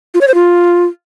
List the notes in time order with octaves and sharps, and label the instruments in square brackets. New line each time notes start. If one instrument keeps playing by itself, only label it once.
[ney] F4
C#5
C5
F4